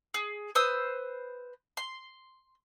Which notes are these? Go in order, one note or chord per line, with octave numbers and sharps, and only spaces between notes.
G#4
B4 C5 D#6 E6
C6